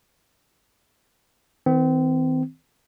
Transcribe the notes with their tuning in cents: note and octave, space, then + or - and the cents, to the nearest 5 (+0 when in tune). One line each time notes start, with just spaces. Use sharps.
D#3 +35 C4 -30